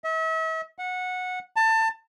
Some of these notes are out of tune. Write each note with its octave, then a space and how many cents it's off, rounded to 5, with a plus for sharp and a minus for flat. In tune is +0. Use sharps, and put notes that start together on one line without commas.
E5 -40
F#5 -15
A5 +25